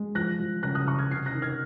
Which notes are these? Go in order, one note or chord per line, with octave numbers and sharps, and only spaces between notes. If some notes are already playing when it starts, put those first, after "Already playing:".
Already playing: G#3
F3 F#6 A#6
F3
C#3 F#6 A#6
D#6 F#6
C#3 C#6 F6
F6 G#6
C3 G#6 C7
F#6 A#6
D#3
F6 G#6